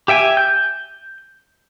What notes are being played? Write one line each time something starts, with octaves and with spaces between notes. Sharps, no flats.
G4 E5 G5 G#5
G6